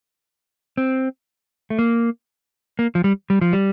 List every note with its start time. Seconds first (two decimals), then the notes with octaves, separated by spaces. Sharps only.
0.77 C4
1.70 A3
1.79 A#3
2.79 A#3
2.95 F3
3.04 G3
3.30 G3
3.41 F3
3.53 G3